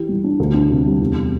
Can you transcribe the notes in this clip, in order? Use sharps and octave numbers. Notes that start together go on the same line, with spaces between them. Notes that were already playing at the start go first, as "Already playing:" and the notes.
Already playing: E3 G4
G3
D4
D2
D4
C3
G3
E2